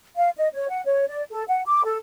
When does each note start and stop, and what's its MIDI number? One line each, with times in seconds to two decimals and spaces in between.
0.16 0.29 77
0.37 0.48 75
0.54 0.69 73
0.69 0.82 78
0.86 1.06 73
1.08 1.22 74
1.31 1.43 69
1.48 1.61 78
1.66 1.82 86
1.84 1.97 69